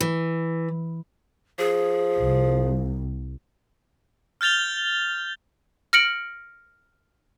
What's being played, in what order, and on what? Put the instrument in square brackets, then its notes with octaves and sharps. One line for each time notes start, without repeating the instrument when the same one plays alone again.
[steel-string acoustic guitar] E3
[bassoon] F3 [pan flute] G#4
[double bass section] C2
[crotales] F6 G6 A6 F7 G7
[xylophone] F6 A#6 C#7 D7 F#7